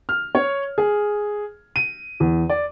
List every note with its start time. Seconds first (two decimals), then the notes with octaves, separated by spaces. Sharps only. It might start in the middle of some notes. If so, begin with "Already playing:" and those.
0.09 F6
0.35 C#5
0.78 G#4
1.76 D#7
2.20 E2
2.49 D5